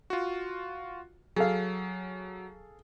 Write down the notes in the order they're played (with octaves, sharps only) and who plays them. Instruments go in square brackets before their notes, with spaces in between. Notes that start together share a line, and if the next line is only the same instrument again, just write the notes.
[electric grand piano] F4 F#4
[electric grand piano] F#3 [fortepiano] G#4 A4 F5